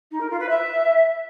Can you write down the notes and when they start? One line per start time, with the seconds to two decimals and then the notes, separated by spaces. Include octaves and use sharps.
0.11 D#4
0.21 A#4
0.30 F4
0.40 B4
0.49 E5